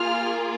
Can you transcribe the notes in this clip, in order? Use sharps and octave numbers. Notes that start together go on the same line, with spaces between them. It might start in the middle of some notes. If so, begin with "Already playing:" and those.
Already playing: A#3 F4 G#4 F6